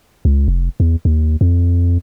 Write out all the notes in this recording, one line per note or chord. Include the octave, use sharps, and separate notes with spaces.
C#2
F1
E2
D#2
F2